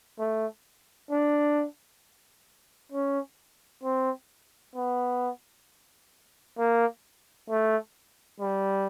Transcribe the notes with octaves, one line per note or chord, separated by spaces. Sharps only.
A3
D4
C#4
C4
B3
A#3
A3
G3